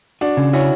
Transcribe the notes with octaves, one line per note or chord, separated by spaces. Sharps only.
D4 F#4
C#3
C#4 E4 F#4